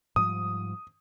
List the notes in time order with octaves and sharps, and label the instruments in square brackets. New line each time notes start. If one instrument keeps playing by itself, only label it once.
[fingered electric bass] G#2 F3 G3 [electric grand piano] D#6